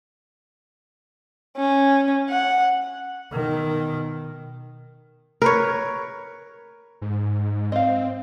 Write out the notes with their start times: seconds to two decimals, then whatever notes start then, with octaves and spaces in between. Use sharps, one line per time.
1.57 C#4
2.30 F#5
3.33 B2 D#3
5.42 A#4 B4 C#5
7.01 G#2
7.72 C4 D#5 F5